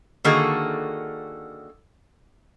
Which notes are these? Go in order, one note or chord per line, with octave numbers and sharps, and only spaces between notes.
D3 D#3 A#3 F#4 G#4 A4